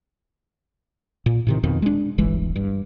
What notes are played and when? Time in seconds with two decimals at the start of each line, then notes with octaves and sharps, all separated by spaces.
1.26 A#2
1.47 A2 C3 D#3
1.63 F2 B2 D#3
1.82 G#3 D4
2.18 D1 G1 E3 G#3
2.56 G2